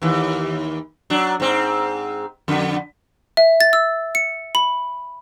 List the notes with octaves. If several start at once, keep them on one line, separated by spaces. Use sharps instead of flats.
D#2 E3
F#3 D4
G#2 C4
F2 D3
E5
A6
E6
C#7
B5